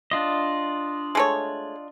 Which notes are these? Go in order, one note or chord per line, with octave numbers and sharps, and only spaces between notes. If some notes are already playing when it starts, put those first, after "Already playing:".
D4 F4 D#5
G#3 A3 C#5